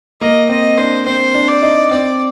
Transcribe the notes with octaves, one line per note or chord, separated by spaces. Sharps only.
A#3 D#5
C4 D#5
D4 C5
C4 C5
D4
D5
D#4
C4 D5